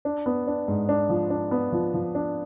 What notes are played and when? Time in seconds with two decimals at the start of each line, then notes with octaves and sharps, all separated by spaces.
0.05 D4
0.26 B3
0.47 D4
0.68 G#2
0.89 D4
1.09 F3
1.30 D4
1.51 B3
1.72 F3
1.94 F3
2.15 D4